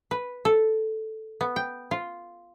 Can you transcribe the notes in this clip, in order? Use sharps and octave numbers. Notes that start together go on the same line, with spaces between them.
B4
A4
B3
G5
F4